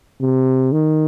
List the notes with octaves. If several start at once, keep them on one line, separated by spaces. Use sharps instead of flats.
C3
D#3